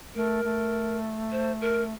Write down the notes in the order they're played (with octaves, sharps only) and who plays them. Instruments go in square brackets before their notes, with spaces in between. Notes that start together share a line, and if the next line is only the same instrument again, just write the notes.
[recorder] A3 [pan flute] A#4
[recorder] A3
[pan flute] C5
A#4